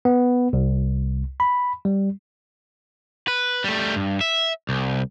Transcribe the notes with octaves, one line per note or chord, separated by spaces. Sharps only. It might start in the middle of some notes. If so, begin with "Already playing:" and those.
B3
C2
B5
G3
B4
G3 A3
G2
E5
C2